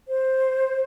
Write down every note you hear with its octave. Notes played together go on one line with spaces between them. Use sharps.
C5